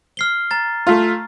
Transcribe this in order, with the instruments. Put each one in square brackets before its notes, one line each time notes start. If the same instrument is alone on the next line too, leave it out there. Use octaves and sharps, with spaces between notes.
[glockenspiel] F6 C7 G7
A#5 A6
[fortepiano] A3 F4